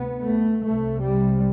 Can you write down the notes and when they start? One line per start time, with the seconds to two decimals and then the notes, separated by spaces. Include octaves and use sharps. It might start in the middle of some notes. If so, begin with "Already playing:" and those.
Already playing: D2 C3 B3
0.24 A3
0.63 C2 C3 A3
1.01 G3